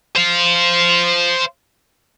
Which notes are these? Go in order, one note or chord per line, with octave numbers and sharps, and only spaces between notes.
C5 F5